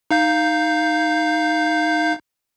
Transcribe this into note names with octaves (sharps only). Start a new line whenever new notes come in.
D#4 F5 G6